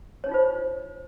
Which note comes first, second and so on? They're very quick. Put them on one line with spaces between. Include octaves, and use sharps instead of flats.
C#5 D4 D#4 F4 C5